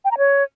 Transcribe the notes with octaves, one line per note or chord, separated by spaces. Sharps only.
G5
A#5
C#5